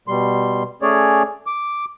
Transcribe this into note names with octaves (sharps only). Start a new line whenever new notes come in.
B2 G3 C6
A3 C#4 G#4 C#5 D5
D6